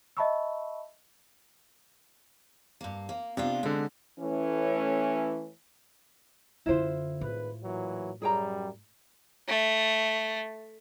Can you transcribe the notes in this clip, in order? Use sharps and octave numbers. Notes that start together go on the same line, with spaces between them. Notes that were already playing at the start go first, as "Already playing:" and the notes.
D#5 E5 A5 B5 C#6 E6
G2 A#3
A#3
C3 B3 D4 F4
D3 G#3 C4
E3 A3 C#4
F#2 D3 E4 F4 C5
G#1 A2 B4
A#2 E3 F#3
F#2 G3 G#4 G5 A#5
A3